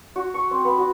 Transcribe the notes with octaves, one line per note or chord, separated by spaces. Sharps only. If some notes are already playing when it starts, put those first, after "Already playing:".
F#4
C#6
C4
B3
F#4